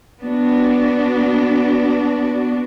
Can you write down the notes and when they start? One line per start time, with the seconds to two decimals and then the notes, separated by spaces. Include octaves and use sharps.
0.20 B3 D4 F#4